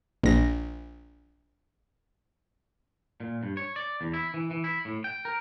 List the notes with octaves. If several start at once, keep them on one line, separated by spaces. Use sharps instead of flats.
A#1 A#6
A#2
G2
C#5
D5
E2
E4
E3
E3
E4
A2
G5
A#4